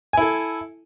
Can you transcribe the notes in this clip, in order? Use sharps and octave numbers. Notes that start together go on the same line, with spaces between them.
E4 A4 G#5